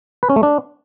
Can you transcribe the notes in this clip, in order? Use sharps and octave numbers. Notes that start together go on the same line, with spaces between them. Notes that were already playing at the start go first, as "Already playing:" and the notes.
B4
C#4
A3
D4